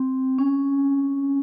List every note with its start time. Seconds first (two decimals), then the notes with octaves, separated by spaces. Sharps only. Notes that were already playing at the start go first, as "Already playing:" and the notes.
Already playing: C4
0.38 C#4